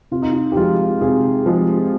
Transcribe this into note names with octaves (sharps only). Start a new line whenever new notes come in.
C3 F4
D#4
F4
G4
F3 G#3 F4
C3 G#4
F3 G#3